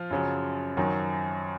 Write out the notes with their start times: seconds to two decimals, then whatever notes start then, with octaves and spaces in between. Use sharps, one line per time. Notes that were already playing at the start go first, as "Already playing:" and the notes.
Already playing: F3 F4
0.10 F#2 C#3 F#3
0.77 F#2 D#3 F#3